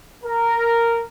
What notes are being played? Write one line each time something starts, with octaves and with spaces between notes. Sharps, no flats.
A#4